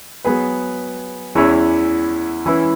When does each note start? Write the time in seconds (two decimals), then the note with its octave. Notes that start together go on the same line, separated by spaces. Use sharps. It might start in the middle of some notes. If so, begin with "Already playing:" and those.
0.25 F#3 B3 G#4 B4
1.35 E2 E3 C#4 E4 C#5
2.46 E3 C#4 E4 B4